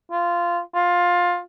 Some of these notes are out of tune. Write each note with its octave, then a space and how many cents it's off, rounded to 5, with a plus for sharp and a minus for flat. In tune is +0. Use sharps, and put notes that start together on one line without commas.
F4 -10
F4 +15